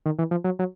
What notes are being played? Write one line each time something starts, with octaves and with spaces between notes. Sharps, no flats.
D#3
E3
F3
F#3
F#3